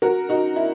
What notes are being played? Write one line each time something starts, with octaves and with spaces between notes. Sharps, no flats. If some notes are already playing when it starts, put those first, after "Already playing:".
F#4 A#4
D#4 F#4
E4